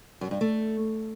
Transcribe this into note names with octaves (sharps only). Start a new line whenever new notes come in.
F#2
G2
A3